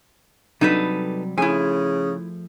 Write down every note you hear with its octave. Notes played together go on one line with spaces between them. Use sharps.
C3 F#3 G3 D#4 A4 B4
C#3 F3 A3 E4 G#4 G#5